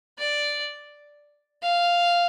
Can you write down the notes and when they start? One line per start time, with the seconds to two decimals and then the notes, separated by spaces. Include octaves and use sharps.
0.18 D5
1.62 F5